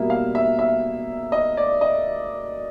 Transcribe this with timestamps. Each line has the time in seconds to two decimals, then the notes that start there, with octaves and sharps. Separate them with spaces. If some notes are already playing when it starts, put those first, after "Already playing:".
Already playing: B2 G3 A#3 E5
0.10 F5
0.35 E5
0.59 E5
1.32 D#5
1.57 D5
1.81 D#5